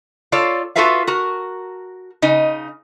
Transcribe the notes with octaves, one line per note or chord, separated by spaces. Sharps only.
F4 A4 C#5 D5 F5
F4 F#4 A4 B4 E5 F5
F#4 A#4
C#3 D#4 D#5